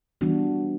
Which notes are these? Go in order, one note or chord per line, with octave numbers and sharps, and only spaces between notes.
E3 G3 B3 D4 F#4